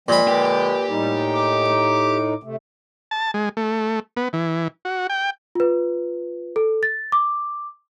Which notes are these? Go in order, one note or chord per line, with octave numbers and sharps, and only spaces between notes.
A#2 F3 G#3 C4 B5
D3 F3 G#3 G4 B4 G5
A2 G3 D#4
D6
C3 A3
A5
G#3
A3
B3
E3
F#4
G5
F4 B4
A4
A6
D6